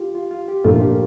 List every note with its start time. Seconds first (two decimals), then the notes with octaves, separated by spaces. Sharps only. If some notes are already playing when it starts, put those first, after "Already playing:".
Already playing: F4 G4
0.15 F4
0.31 F4
0.48 G4
0.64 A#2 F3 A3 D4 F4
0.81 G4